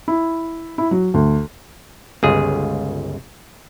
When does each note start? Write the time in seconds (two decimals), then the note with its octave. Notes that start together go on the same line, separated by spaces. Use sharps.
0.08 E4
0.78 E4
0.91 F#3
1.14 D2
2.23 G1 C#2 G#4